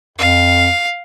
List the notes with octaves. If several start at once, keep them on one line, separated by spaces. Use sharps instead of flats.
F2 F5